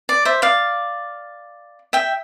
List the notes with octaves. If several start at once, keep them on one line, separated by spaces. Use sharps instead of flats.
D5
C5 E5
D5 F5
E5 G5